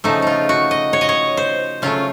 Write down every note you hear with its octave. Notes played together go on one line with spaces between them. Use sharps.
C#3 F3 A3 D#4
D#4 F4
F#4
D#5
C#5
D#5
C#5
C5
C#3 F#3 A3 F4